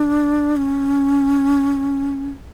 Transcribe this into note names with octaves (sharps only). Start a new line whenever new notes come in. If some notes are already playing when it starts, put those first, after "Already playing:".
Already playing: D4
C#4